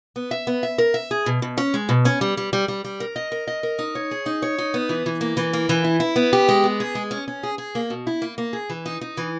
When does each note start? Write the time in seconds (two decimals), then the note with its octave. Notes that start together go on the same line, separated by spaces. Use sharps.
0.16 B3
0.31 E5
0.47 B3
0.63 E5
0.78 A#4
0.94 E5
1.11 G#4
1.26 B2
1.42 B2
1.58 C#4
1.74 G#3
1.89 B2
2.05 C#4
2.21 G3
2.37 G3
2.53 G3
2.68 G3
2.85 G3
3.00 A#4
3.16 D#5
3.32 A#4
3.47 D#5
3.63 A#4
3.79 D#4
3.95 C#5
4.11 G#4
4.26 D#4
4.42 C#5
4.58 D#4
4.74 B3
4.89 E3
5.06 E3
5.21 A#3
5.37 E3
5.53 A#3
5.69 E3
5.84 E4
6.00 E4
6.16 B3
6.33 G4
6.49 G#3
6.64 B3
6.80 G#4
6.95 G#3
7.11 C#4
7.28 C#4
7.43 G#4
7.58 G#4
7.75 A#3
7.90 B2
8.07 E4
8.22 A#3
8.38 A#3
8.53 G#4
8.70 E3
8.86 D#4
9.01 D#4
9.17 E3